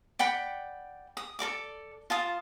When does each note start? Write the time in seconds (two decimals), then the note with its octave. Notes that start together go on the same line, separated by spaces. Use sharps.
0.19 D5 F#5 G5 B5
1.17 D#6
1.39 A4 A#4 D5 D6
2.10 F4 A5 D#6